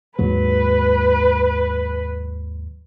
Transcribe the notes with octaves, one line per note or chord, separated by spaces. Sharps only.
D#2 G#2 F#3 B4